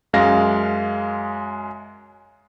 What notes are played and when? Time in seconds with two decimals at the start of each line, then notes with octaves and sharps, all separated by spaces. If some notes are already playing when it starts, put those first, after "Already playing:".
0.13 F#2 G#3 F5 A#6